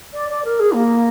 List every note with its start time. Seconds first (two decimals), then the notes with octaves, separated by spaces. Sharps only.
0.13 D5
0.29 D5
0.44 A#4
0.59 G#4
0.73 A#3